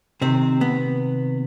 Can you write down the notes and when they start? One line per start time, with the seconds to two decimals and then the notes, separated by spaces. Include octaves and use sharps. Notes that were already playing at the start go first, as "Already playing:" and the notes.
0.21 C3 D#3 C4
0.61 B3